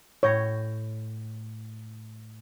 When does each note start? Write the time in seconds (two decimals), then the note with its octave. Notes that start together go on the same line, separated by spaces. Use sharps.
0.23 A2 C#5 G6 A#6